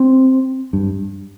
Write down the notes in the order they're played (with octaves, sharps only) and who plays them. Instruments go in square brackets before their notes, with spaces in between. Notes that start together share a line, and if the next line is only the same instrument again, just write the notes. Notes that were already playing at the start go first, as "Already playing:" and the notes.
Already playing: [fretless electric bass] C4
G2